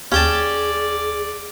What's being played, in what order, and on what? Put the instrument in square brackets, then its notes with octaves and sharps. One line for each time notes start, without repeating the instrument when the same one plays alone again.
[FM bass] D#2 [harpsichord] C#4 G5 A5 [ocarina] G#4 [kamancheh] D5